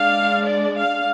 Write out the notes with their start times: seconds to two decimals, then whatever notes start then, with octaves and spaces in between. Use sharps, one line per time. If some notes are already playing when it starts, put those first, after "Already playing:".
Already playing: G#3 D4 F5
0.47 D5
0.77 F5